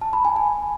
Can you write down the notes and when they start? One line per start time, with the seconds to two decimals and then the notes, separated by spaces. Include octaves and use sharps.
0.01 A5
0.13 B5
0.25 G#5
0.36 G#5